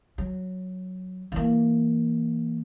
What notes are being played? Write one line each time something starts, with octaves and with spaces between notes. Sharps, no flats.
F#3
E3 A#3